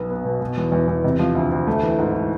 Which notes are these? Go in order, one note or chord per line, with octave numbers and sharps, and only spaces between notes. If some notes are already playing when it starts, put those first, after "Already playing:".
Already playing: B1 B3
B3
B2
B2
E2
E2
E2
C3
F3
D2
D2
A3
E3
G#2
E3